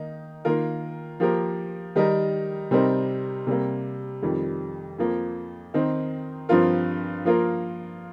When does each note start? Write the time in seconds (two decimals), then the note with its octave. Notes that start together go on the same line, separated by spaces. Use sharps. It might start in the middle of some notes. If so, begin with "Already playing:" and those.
Already playing: D#3 A#3 D#4
0.45 D#3 A#3 F4 A#4
1.20 F3 A#3 G4 A#4
1.96 D#3 G3 D#4 A#4
2.71 C3 G3 C4 D#4 A#4
3.47 C3 G3 A#3
4.22 F2 D#3 G3
4.98 F2 F3 A#3
5.74 D#3 C4 D#4 A#4
6.49 G2 F3 C4 F4 A#4
7.25 F3 A#3 F4 A#4